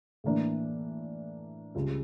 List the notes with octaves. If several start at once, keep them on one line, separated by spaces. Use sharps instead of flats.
A2 E3 A#3 D4
C#2 C#3 G3 C#4 F4